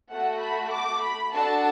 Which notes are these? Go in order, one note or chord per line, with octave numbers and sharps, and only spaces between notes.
A3 F#4 A4 F#5
B5
D6
B5
D4 F#4 A4 A5